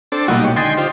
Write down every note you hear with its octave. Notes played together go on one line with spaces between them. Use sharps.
C4 D4 A4
B1 A#2 G3 A#3 D#4 E4 F#4 F#6
G#3 G4 C#5
D3 D#3 D#5 G5 G#5 C6 A6
F4 G4 C5